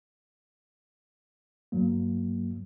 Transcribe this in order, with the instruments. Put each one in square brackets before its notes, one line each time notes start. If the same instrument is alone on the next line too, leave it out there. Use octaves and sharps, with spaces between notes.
[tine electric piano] G2 F#3 A#3